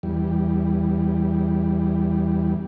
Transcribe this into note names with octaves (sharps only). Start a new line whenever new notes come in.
E2 G3